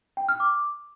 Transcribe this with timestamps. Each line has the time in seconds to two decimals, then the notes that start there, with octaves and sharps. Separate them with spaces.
0.17 G5
0.29 F6
0.40 D6